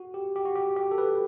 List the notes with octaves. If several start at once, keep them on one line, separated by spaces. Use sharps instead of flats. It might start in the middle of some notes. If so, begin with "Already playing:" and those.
Already playing: F#4
G4
G4
F#4
G4
G4
A4
B4